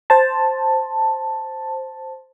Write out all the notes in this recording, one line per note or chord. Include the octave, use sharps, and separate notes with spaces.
C5 A5